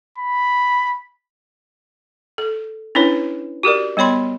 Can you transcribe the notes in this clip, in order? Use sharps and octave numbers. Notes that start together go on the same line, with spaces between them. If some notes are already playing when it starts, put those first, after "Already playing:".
B5
A4
C#4 D4 E4 B4 C#5
F#4 G4 A#4 D5
G3 B3 C#5 B5 C6